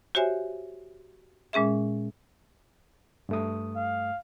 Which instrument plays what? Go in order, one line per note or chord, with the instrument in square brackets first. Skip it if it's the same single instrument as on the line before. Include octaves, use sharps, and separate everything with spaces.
[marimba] F#4 G4 C5 C#5 E5 G#5
A#2 G#3 C#4 G#4 E5
[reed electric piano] G2 A3 D#6
[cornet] F5